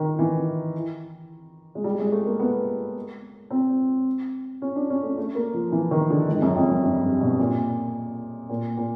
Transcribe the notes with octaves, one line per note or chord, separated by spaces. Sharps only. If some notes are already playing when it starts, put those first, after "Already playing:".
Already playing: D#3
E3
G#3
G3
G#3
A3
A#3
B3
C4
C#4
D4
C#4
A3
A3
A#3
F3
E3
D#3
D3
G#2
F#2
F2
F#2
G2
G2
B2
A#2
A#2
A#2